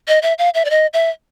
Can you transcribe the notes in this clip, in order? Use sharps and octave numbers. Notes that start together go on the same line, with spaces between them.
D#5
E5
F5
E5
D5
D#5
E5